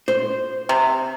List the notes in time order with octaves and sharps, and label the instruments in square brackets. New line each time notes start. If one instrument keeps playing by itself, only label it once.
[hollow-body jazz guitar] C5
[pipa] C3